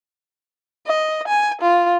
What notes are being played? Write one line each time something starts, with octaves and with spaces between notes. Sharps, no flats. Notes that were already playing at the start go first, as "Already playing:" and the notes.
D#5
G#5
F4